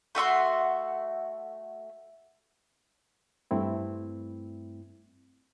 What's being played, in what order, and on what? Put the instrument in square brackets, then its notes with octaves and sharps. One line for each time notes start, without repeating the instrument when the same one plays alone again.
[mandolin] A3 F#4 E5 C6
[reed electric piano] G2 A3 C4 E4